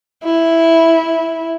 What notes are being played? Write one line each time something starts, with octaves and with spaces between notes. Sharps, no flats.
E4